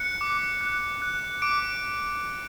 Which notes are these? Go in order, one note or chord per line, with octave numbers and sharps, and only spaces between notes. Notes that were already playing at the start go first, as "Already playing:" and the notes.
Already playing: F#6 C#7
D6
F#6
F#6
D6 D7